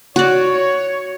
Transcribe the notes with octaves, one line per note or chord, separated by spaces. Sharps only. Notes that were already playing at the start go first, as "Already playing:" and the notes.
F#4 C#5 D5